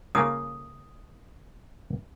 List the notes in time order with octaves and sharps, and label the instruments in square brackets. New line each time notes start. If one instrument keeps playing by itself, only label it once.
[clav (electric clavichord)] C#3 A#3 F4 [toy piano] D#6